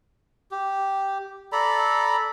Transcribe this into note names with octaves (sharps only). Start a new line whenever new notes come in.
G4
A4 D5 A#5 B5